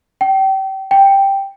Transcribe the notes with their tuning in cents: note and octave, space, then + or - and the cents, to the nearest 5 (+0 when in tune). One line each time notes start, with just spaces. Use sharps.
G5 -30
G5 +5